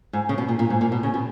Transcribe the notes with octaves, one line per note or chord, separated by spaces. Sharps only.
G#2
C#3
B2
A#2
A#2
G#2
A#2
B2
C#3
B2